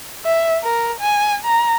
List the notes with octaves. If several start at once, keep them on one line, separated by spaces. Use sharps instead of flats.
E5
A#4
G#5
A#5